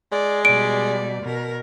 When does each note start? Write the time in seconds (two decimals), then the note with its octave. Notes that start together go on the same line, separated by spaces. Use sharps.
0.12 G#3 D5
0.45 B2 G3 D5 D7
1.22 B2 A#4